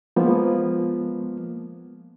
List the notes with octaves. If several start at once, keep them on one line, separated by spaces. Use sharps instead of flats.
F3 G#3 A#3 B3